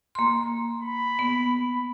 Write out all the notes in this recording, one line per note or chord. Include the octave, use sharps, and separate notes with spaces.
A#3 C6
B5
B3